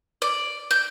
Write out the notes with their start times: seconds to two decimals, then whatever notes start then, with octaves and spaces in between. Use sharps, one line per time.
0.22 D5
0.71 G6